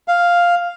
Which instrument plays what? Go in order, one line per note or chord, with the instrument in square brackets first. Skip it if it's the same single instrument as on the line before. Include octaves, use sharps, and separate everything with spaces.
[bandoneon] F5